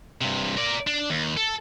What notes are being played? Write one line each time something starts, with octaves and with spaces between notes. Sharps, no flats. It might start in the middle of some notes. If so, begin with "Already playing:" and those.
G2 C3
A#4 D5
D4
D#2
A4